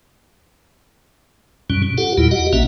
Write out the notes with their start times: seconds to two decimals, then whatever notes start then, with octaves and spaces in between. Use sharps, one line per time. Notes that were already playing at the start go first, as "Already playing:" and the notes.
1.70 F#2 B2 G3 C#4
1.83 B2
1.98 F4 G4 A4 F#5
2.18 E2 A#2 G3 E4
2.31 F#4 G4 D#5 F#5
2.53 A#1 B2 A#3 C#4 E5 F#5